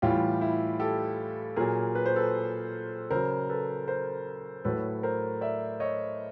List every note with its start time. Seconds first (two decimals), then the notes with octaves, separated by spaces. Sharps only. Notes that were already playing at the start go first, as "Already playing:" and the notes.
0.02 A2 E3 G3 F4 G4
0.41 E4
0.80 G4 A4
1.56 A#2 F#3 G#4 A#4
1.95 B4
2.06 C5
2.16 A4 B4
3.11 C#3 F#3 A#4 C5
3.49 A4 B4
3.88 A#4 C5
4.64 A2 F#3 A4 B4
5.03 A#4 C5
5.41 D5 E5
5.80 C#5 D#5